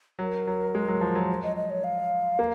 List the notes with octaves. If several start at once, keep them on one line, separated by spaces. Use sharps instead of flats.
F#3 A#4
F#3
G#3
F#3
F3
F#3
C5
D#5
D#5
C#5
F5
A#3